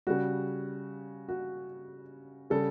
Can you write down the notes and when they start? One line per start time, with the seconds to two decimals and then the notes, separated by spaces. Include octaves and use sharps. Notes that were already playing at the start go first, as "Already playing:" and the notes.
0.07 C#3 G3 F#4
1.29 F#4
2.50 C#3 G3 A4